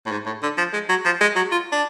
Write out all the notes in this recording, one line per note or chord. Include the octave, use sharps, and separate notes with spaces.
A2
G#2
A2
D3
F3
G#3
F#3
F3
G#3
F#3
F4
D4